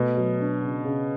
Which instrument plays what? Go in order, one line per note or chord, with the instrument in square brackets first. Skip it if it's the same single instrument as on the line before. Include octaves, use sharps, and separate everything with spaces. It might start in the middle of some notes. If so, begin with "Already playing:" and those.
Already playing: [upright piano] B2 [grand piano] A3
[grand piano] F#3
D4
C#3
C#3